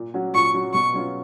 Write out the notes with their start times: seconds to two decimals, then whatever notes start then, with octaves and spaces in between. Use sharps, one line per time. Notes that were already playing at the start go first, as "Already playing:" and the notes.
Already playing: A#2
0.14 F#3 C#4 F#4
0.34 A#2 C#6
0.54 F#3 C#4 F#4
0.73 B2 C#6
0.93 F#3 C#4 F4